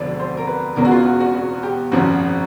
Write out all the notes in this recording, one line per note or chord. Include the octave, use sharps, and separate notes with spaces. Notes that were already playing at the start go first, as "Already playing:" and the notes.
Already playing: E1 D2 D3 F3 D5
C5
A#4
B4
E1 E2 C#3 E3 A#4
F#4
F4
F#4
F#4
F#4
G4
G#1 F#2 C#3 F3 F#4